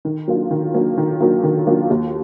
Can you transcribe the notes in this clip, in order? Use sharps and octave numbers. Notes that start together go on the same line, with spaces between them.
D#3
F#3 A#3 D4 F4
D#3
F#3 A#3 D4 F4
D#3
F#3 A#3 D4 F4
D#3
F#3 A#3 D4 F4
D#2